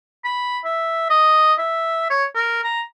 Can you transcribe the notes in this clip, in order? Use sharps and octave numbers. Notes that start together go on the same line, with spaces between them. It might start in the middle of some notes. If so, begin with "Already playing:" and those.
B5
E5
D#5
E5
C#5
A#4
A#5